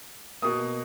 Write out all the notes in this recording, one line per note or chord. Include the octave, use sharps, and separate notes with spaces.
B2 A#3 D#6